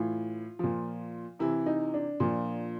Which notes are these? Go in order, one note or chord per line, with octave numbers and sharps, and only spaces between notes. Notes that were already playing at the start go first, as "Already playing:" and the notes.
Already playing: A2 E3 F4
A#2 F3
C3 E3 E4
D#4
D4
A#2 F3